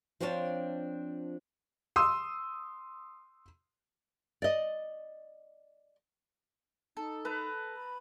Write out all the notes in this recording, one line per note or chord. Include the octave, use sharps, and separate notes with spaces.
F3 C4 D4 F4 C#5 A5
C6 D#6 E6
D5 D#5
D#4 A4
B4 A5 A#5
B5